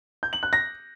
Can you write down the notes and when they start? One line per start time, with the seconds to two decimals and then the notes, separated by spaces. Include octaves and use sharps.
0.23 G6
0.33 F#7
0.43 F#6
0.53 A#6